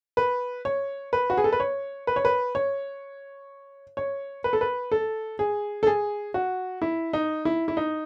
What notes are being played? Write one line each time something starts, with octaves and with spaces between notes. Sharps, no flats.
B4
C#5
B4
F#4
G#4
A4
B4
C#5
B4
C#5
B4
C#5
C#5
B4
A4
B4
A4
G#4
A4
G#4
F#4
E4
D#4
E4
E4
D#4